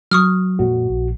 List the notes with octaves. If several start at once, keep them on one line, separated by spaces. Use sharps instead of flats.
F#3 C#6 D#6 F6
F2 A#2 A#3 F#4
A#1